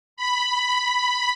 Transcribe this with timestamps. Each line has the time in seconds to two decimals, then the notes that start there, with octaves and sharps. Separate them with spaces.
0.17 B5